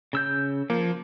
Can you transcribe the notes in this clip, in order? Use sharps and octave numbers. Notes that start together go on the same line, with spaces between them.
C#3 E6 G6
F3 A#3